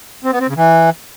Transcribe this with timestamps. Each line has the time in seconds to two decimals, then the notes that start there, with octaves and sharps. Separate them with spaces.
0.24 C4
0.32 B3
0.40 C4
0.48 C#3
0.56 E3